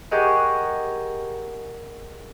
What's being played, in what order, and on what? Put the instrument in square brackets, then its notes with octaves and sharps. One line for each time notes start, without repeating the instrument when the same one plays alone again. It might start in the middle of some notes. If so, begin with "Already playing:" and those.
[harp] G4 G#4 A#4 D#5 F#5 C#6